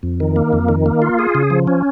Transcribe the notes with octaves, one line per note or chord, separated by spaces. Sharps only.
F2
D#3
A#3
F2
D#3
A#3
F4
G#4
C#3
F3
C#4